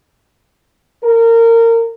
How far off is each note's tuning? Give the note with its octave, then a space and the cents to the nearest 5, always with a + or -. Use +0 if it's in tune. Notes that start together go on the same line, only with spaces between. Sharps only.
A#4 -25